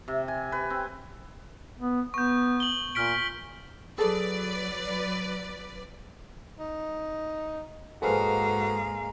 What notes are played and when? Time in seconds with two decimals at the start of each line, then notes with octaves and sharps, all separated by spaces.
0.08 C3
0.28 G#5
0.52 B4
0.70 C4
1.79 B3
2.14 B3 C#6 G6
2.60 F#7 G7
2.95 A#2 F6 B6 D7
3.98 F#3 G#4 A4 B4 D5
6.60 D#4
8.02 G#2 G#3 A#3 F#4 A4 B4 C5 F5